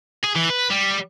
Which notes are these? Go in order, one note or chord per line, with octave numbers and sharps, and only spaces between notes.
G#4
E3
B4
G3